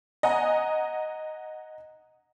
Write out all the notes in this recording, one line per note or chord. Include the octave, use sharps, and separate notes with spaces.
D#5 F#5 G#5 A#5